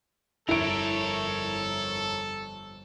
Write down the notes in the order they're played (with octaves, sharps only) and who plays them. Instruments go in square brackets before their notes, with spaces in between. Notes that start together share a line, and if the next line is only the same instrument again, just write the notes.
[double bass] G1 F2 [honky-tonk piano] E4 D7 [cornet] A4 [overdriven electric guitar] A#4 C#5